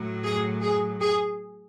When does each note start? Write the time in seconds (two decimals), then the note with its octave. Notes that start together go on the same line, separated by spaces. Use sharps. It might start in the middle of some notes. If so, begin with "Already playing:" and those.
Already playing: A2 F#3
0.24 G#4
0.62 G#4
1.01 G#4